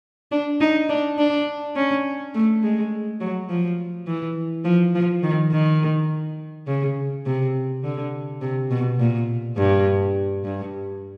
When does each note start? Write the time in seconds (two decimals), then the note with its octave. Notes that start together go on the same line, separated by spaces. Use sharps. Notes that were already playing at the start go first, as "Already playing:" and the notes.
0.32 D4
0.61 D#4
0.90 D4
1.18 D4
1.76 C#4
2.34 A3
2.63 G#3
3.21 F#3
3.49 F3
4.07 E3
4.65 F3
4.95 F3
5.23 D#3
5.52 D#3
6.67 C#3
7.26 C3
7.84 D3
8.41 C3
8.71 B2
8.99 A#2
9.57 G2
10.44 G2